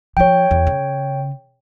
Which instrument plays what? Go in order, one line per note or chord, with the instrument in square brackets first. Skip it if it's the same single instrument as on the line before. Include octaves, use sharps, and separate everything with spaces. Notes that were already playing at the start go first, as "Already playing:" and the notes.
[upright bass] F3 F4 [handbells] C#5 G5
[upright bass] E2
C#3